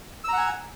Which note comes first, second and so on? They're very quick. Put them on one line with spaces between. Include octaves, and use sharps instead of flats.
E6 A#5 F#5 G#5